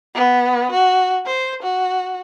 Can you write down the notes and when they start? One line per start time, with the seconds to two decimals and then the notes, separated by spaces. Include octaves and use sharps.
0.15 B3
0.71 F#4
1.26 C5
1.62 F#4